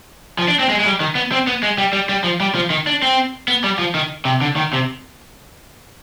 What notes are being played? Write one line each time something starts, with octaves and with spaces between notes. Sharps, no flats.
F3
D4
C4
G#3
G#3
G3
D#3
B3
C4
B3
G#3
G3
G3
G3
F3
G3
F3
D#3
D4
C4
B3
G3
F3
D#3
C3
D3
D#3
C3